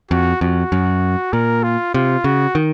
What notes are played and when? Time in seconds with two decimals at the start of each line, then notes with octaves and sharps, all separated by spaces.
0.11 F2 F#4
0.41 F2 F#4
0.72 F#2
1.33 A#2 A#4
1.63 F4
1.94 C3 F4
2.24 C#3 F#4
2.55 D#3